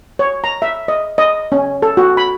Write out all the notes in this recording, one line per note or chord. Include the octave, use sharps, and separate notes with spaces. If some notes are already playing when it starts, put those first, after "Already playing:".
C#5
A#5
E5
D#5
D#5
C#4
A4
F#4
B5